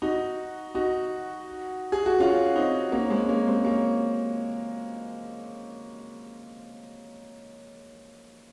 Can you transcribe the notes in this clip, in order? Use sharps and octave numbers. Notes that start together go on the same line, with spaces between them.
D#4 F#4
D#4 F#4
G#4
F#4
C#4 F4
C4 D#4
A#3 C#4
G#3 C4
A#3 C#4
G#3 C4
A#3 C#4